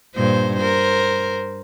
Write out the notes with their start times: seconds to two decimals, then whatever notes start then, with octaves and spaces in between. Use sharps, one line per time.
0.15 G2 A#2 C5
0.57 A#4 C5